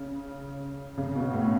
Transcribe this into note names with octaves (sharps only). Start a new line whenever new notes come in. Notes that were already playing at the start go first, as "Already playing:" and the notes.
Already playing: C#3
C#3
B2
A2